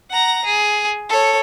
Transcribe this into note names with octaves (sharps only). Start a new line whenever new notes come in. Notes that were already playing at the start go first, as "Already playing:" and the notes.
F#5 A#5
G#4
A4 C#5